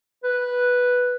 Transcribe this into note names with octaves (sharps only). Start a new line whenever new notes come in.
B4